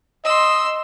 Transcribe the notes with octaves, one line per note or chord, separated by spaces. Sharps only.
D#5 C6 E6